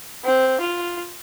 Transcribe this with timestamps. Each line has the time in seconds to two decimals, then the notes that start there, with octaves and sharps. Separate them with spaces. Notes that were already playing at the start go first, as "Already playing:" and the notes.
0.24 C4
0.61 F4